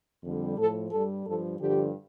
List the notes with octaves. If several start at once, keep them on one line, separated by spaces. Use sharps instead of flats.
F2 D3 G3
A2 F3 A4
G2 G3 A4
G2 F3 A4
G2 D3 F3 G4